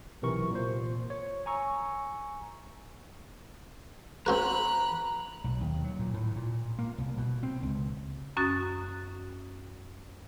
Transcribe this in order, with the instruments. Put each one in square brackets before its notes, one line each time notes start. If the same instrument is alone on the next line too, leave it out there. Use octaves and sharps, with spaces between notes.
[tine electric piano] B1 C3 E3 A#4 C#6
A#2 C5
C#5
G#5 A#5 C#6 E6
[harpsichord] C4 F#4 B4 [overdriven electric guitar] A#5 [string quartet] B5 F#6
[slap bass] B1
D#2
F#3
A#2
A2
A#2
A#3
C2
B2
C4
C#2
[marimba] F#2 C#4 F#4 D#6 A6